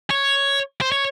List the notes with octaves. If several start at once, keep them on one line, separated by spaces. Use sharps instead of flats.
C#5
C5
C#5